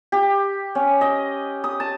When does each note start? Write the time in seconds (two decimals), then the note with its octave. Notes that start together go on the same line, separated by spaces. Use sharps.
0.12 G4
0.75 C#4
1.01 D#5
1.64 D#6
1.80 A5